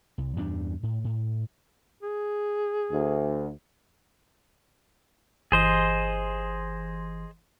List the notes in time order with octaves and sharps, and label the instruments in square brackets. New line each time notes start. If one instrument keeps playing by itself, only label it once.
[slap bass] C2
E2 G2 G3 D4
A2
A2
[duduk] G#4
[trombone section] D2
[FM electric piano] G1 E3 C6 [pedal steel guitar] G#4 C5 D#5